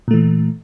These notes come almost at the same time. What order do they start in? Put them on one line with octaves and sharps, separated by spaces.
A#2 A3 E3